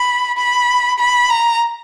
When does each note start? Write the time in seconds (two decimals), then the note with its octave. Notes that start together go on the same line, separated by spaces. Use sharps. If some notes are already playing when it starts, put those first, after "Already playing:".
Already playing: B5
0.38 B5
0.99 B5
1.30 A#5